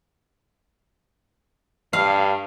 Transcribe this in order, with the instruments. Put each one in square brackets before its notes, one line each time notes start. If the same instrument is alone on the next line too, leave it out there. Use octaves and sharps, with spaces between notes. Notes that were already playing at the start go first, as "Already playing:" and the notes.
[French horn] G2 [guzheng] F5